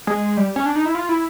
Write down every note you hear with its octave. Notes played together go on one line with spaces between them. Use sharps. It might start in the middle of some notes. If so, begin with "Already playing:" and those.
G#3
G3
C#4
D4
D#4
E4
F4
E4